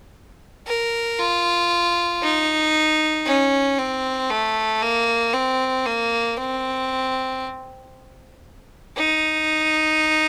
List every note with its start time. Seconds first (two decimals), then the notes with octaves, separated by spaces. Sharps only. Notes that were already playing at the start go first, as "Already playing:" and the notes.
0.67 A#4
1.19 F4
2.22 D#4
3.26 C#4
3.78 C4
4.30 A3
4.82 A#3
5.33 C4
5.86 A#3
6.37 C4
8.97 D#4